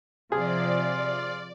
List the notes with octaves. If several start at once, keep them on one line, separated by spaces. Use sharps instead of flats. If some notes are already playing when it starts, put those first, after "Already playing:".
C3 F3 F4 G#4 D5